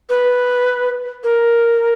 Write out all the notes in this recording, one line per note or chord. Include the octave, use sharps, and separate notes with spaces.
B4
A#4